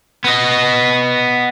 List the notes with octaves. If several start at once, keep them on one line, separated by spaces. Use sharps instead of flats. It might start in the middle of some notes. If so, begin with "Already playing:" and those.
B3 D#5